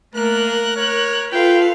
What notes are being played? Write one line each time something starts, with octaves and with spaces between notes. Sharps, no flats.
A3 A#3 A#4 F#6
A#4 C#5
F4 A4 B4 F5 G5